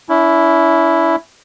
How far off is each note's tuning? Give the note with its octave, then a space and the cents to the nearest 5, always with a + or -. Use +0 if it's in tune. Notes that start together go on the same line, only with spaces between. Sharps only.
C#4 +45 E4 +0